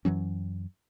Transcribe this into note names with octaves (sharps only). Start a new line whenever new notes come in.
F#2 E3 F#3 C#4